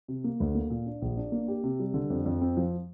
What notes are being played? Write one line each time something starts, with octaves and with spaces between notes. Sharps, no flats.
C3
A#3
D2
A#3
A#2
D4
A#1
D4
A#3
G4
C3
G3
D3
F2
F2
C4
F3